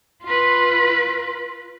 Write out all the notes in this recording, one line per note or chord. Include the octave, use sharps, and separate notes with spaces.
F4 B4